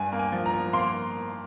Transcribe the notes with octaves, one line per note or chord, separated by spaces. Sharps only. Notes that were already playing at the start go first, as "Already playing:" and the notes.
Already playing: G2 G#5
A#3
G#5
F3
A#5
F3
A#3 C6